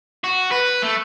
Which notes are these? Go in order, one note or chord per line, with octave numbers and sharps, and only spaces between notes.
F#4
B4
A3